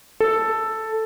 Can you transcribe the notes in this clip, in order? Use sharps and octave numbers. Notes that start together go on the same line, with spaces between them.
A4